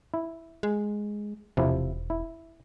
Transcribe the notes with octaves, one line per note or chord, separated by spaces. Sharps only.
E4
G#3
E1 C3 F3 E4
E4